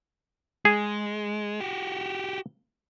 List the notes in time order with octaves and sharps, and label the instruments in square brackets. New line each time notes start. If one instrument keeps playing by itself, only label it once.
[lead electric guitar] G#3 [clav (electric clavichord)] G#4
[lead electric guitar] F#4 G4